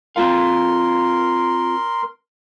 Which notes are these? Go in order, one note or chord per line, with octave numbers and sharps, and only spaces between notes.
C4 F4 A#4 F5 C6